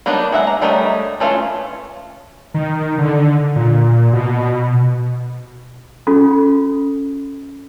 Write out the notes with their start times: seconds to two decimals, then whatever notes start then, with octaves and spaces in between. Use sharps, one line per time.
0.06 F#3 A#3 B3 D4 D#4
0.32 G#3 E5 F#5
0.47 A#5
0.62 G3 A3 A#4 C#5 D#5
1.20 E3 A3 C#4 F4
2.54 D#3
2.98 D3
3.56 A#2
4.13 B2
6.07 C#4 F4 F#4 A4